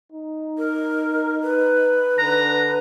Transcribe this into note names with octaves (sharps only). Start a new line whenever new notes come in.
D#4
A#4
B4
D3 A#5